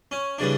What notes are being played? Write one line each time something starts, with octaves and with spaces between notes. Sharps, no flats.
C#4
C#3 E3 G3 D4